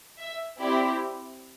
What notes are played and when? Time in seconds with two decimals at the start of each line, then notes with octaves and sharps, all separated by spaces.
0.20 E5
0.59 C4 E4 G4 D5